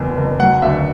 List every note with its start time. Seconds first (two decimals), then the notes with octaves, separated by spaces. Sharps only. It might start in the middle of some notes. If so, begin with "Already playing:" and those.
Already playing: F#1 E2 B2 A#3
0.17 F#1
0.40 F#3 F#5
0.62 D2 E5